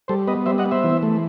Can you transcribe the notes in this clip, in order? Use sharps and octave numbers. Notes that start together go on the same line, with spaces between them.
G3 A4 C5
B3 B4 D#5
G3 C5 E5
D#5 F#5
B3
C5 E5
E3
A3